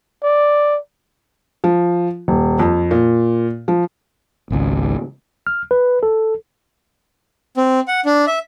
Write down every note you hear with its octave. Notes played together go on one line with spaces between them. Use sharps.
D5
F3
D#1
F2
A#2
F3
G#1 C#2
F6
B4
A4
C4
F#5
D4
E5